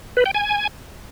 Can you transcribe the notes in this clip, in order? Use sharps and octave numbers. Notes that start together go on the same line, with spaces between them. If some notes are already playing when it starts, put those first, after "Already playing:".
B4
G5
G#5